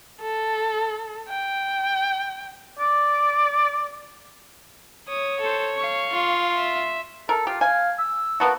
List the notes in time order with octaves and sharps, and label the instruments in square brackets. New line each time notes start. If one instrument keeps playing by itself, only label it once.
[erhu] A4
G5
[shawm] D5
[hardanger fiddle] C#5 [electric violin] D#6
[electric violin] A4 C5
F5 C#6
[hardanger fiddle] F4
[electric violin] E5
[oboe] A4 [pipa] A#4
[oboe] F4 [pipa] G4
[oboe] F5 [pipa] G#5
[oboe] E6
[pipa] A#3 B3 F#4 [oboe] A5